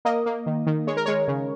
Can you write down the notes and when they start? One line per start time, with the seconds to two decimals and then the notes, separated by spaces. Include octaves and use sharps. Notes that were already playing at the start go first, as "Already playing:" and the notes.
0.05 A#3 D#5
0.26 A#3
0.46 D#3
0.67 D#3
0.87 G#3 C#5
0.97 A#4
1.06 G#3 C#5
1.28 C#3